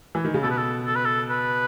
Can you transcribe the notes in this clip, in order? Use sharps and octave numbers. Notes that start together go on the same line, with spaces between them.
E3
D#3
C#3
B2 A4
B4
A4
A4
B4
A4
B4